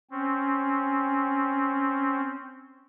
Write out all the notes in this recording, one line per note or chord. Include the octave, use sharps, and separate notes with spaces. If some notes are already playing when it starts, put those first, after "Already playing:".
C4 C#4